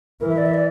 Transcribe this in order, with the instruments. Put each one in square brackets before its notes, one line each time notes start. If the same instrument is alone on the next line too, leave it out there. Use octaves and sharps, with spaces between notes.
[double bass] E3 [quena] A#4
[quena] E5
D5
E5
D5